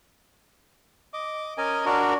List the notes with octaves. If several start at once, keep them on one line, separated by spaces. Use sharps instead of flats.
D#5 D6
C#4 A#4 D#5 G#5
D4 F#4 A#4